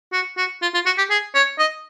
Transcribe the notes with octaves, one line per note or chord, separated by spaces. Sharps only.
F#4
F#4
F4
F4
F#4
G4
G#4
C#5
D#5